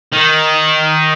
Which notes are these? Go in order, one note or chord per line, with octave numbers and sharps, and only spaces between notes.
D#3